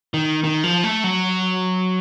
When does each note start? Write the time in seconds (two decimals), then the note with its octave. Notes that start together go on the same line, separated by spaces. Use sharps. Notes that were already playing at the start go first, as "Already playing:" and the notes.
0.14 D#3
0.44 D#3
0.64 F3
0.84 A3
1.04 F#3